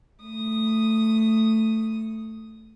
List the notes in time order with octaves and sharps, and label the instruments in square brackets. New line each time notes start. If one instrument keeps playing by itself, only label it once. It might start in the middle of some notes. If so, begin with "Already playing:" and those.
[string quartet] A3 D#6